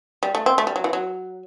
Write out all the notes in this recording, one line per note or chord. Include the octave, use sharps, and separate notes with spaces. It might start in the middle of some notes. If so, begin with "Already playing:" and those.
G3
A3
C4
A3
G3
F#3
E3
F#3